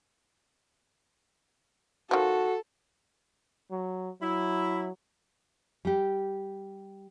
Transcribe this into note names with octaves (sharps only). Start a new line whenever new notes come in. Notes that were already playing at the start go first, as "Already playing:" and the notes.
D#3 F3 F#4 A4
F#3
F#3 E4
G3 G4